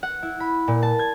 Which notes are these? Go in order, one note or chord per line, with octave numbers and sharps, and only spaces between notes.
F#5
E4
B5
A#2
A5
G#6